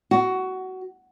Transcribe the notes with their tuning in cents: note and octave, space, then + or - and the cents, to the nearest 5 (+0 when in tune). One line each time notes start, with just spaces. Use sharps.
F#4 +15